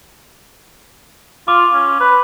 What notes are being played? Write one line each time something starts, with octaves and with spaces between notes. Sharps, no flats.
F4 D6
C#4
B4